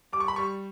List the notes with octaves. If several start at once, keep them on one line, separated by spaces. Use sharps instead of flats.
G3 D6
C#6
B5
G3 C#6